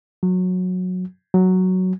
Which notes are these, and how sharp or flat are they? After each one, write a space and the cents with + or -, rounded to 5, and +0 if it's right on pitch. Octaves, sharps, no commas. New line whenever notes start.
F#3 -15
F#3 +5